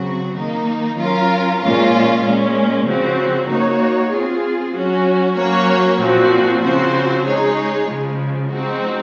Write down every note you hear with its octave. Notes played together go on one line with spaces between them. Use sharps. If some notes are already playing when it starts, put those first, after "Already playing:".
Already playing: C#3 F#3 C4 F#4
D#3 A#3 D#4
F#3 C#4 F4 A#4
A#2 F3 G#3 C#4 F4
A#2 G#3 C#4
C#3 F3 C4 F#4
A#3 D#4 F#4 C#5
C4 F4 G#4
F#3 C#4 F#4
F#3 A#3 C#4 F#4 C#5
A#2 F3 C4 F#4
C#3 F3 C4 F#4 C5
G#3 D#4 G#4 C#5
C#3 F3 G#3
F3 G#3 C4 D#4 F#4